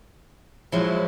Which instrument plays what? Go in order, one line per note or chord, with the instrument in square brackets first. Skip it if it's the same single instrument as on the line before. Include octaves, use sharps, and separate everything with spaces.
[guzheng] F3 F#3 [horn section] G#3 E4